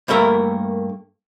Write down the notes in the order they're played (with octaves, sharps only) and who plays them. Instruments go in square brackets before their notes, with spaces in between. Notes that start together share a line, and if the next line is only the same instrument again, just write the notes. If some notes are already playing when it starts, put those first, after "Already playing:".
[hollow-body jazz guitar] G2 A3 A#3 A#4 E5